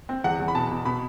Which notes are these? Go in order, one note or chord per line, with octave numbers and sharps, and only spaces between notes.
C4
E2 F#5
E2
B5
B2 A5
B2
B2 B5